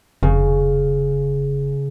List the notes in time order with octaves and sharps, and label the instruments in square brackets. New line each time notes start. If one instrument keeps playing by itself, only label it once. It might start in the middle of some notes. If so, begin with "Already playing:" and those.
[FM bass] F1 [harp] C#3